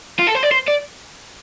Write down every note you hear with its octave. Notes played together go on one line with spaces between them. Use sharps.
F4
A4
C5
D5
C5
D5